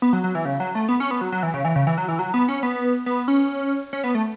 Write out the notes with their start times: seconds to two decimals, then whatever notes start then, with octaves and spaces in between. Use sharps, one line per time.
0.02 B3
0.13 F#3
0.24 F#3
0.35 E3
0.45 C#3
0.60 F#3
0.75 A3
0.89 B3
1.00 C#4
1.11 B3
1.21 F#3
1.32 F#3
1.43 E3
1.54 C#3
1.65 E3
1.76 C#3
1.87 E3
1.98 F#3
2.08 E3
2.19 F#3
2.34 B3
2.48 C#4
2.63 B3
3.06 B3
3.28 C#4
3.93 C#4
4.04 B3
4.15 A3